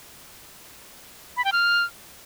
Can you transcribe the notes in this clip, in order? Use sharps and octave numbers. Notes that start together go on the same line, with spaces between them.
B5
G5
F6